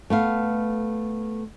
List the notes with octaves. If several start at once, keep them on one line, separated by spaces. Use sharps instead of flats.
A3 B3 F5